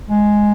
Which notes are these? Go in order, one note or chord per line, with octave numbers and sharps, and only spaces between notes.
G#3